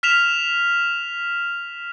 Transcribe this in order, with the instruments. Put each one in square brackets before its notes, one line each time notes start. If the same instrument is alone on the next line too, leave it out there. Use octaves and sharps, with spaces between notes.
[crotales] F6 B6 E7 F7